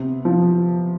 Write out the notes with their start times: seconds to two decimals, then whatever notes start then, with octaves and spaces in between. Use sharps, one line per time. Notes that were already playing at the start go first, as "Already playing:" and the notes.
Already playing: C3 B3
0.25 F3